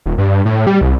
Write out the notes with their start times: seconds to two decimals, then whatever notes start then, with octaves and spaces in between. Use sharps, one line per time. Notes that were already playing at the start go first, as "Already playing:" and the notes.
0.06 D#1
0.18 G2
0.45 A2
0.67 G3
0.81 C2